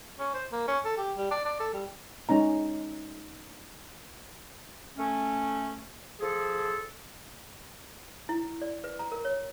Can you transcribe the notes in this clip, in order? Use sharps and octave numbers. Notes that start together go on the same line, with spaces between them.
C#4
C5
A#3
C#4
A4
G4
G3
D5
D5
A4
G3
G#3 C#4 D#4 A#5
A3 C#4
F3 G#4 A4
E4
D5
B4
A#5
A#4
C#5